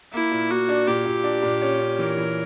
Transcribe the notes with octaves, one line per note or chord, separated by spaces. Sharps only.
A#3 E4
A#2
A#3 F#4
D4
A#2 G4
A#2
D4
A#2
C#4
C#4
E3 A#4
E3